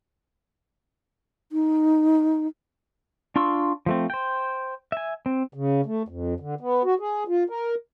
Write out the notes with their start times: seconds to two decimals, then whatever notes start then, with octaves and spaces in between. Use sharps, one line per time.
1.52 D#4
3.36 D4 F4 C6 C#6 E6
3.86 F3 A3 C4
4.10 C5 G5
4.92 E5 G#5
5.26 C4
5.54 C#3
5.86 A3
6.08 F2
6.40 D3
6.61 B3
6.84 F#4
7.00 G#4
7.28 F4
7.50 A#4